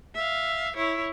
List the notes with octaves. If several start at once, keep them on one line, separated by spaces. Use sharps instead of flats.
E5 F5
E4 C#5